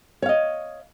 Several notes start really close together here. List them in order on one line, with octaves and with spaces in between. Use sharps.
C#5 F5 D#5